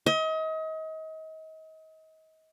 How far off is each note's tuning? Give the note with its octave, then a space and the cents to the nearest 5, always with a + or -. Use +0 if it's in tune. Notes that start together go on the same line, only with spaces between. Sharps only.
D#5 +35